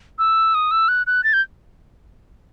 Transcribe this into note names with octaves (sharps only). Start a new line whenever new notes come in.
E6
D#6
E6
F#6
F#6
A6
G6